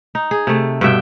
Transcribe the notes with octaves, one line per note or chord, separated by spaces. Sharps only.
D#4
G#4
C3 A3
G2 B2 E5 G5